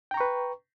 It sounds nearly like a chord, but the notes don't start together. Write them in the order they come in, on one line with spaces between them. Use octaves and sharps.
G5 A#5 C#6 B4